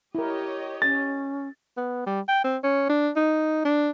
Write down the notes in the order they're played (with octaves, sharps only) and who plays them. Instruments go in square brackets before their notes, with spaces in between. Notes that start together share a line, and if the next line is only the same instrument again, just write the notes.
[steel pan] E4 A#4 [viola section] G4 C#5 D#5
[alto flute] C#4 [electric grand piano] A6
[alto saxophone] B3
G3
G5
C4
C#4
D4
D#4
D4